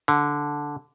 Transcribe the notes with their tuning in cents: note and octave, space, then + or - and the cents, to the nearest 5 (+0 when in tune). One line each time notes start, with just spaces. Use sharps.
D3 -5